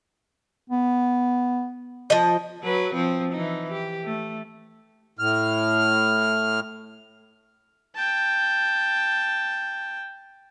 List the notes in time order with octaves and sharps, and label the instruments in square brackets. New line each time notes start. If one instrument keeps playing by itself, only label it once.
[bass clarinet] B3
[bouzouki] F3 D#5
[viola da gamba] F#3 B4
F3 C4
E3 D#4
G4
A3
[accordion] A2 F6
[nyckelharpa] G5 A5